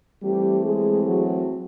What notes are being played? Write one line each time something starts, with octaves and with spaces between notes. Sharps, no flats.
E3 G3 A3 C4 G4
G#3 G#4
F#3 F#4